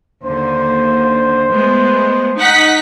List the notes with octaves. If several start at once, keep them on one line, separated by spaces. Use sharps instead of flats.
D#2 D3 C5
G#3 A3 B3
D#4 F#5 B6